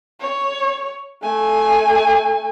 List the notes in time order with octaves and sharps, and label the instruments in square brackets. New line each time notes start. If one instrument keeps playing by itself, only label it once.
[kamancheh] C#5
A3 G#5